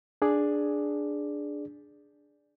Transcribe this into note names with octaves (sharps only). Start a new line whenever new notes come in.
D4 G#4 D5